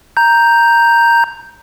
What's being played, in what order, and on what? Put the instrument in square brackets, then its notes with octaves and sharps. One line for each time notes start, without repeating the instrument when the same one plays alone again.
[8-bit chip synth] A#5 G6